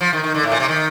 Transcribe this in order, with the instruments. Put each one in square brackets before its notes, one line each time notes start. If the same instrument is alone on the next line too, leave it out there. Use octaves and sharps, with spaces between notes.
[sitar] F3
D#3
D#3
D3
A2
A#2
C3
D#3